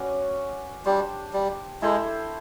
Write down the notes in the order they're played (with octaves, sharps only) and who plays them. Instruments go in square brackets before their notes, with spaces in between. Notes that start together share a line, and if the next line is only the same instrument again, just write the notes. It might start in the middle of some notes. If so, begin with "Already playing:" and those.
Already playing: [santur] C#4 F#4 B4 D5
[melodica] G3 [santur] D4 G4 C5
[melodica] G3
[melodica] G#3 [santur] E4 A4 C5